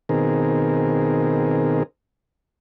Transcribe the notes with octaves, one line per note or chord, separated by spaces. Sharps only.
B2 D#3 C4 G#4 A#4